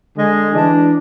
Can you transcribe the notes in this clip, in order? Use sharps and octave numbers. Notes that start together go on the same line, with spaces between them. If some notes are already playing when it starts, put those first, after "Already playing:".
D3 G#3 G#4
E3 D4